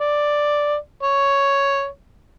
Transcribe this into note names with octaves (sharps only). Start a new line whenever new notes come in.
D5
C#5